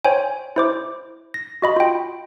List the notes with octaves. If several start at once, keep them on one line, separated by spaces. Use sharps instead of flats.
C5 C#5 G5 G#5
E4 C5 D6
A#6
F#4 D#5 B5
F4 G5